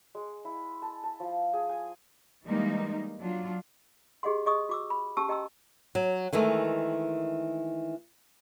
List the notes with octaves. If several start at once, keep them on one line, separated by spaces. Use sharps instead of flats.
G#3
E4
A5
A5
F3
G#4
G#5
E3 G3 G#3 A#3 D#4
F#3 D4 F4
G4 G#4 D#5 F#5 C6
G#4 D#5 C#6 D#6
F#4 D6 E6
B5
C#4 G4 A5 C#6 E6
G4 D#5 G5 A#5 C6 E6
F#3
D#3 E3 G#3 A3